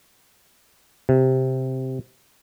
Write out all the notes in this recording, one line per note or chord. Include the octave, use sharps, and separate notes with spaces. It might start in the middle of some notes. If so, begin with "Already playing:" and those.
C3